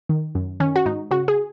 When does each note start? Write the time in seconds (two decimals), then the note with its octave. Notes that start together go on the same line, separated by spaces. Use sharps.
0.09 D#3
0.35 F#2
0.60 D#3 C#4
0.76 F#4
0.86 G#2 D#4
1.11 C#3 F#4
1.28 G#4